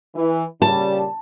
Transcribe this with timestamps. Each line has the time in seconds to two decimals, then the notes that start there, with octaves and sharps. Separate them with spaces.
0.15 E3
0.62 A#2 C#3 G3 A5